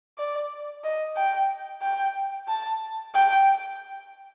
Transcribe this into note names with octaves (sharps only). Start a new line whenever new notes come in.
D5
D#5
G5
G5
A5
G5